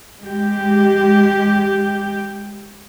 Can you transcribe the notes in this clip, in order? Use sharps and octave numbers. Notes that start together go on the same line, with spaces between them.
G#3 G4